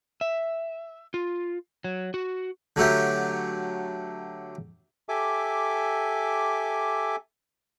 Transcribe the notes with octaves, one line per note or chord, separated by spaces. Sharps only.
E5
F4
F#3
F#4
D3 F#3 A3 G4
G4 A4 E5 G#5 D6